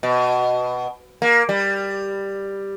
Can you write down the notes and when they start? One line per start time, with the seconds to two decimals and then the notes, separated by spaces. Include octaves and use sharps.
0.03 B2
1.22 A#3
1.49 G3